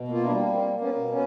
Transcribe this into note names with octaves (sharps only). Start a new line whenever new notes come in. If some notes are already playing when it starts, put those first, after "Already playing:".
Already playing: B2
A#3 F4
D4 E4
G3
A#3 C4
A#3
B3 C#4
B2
B3 C#4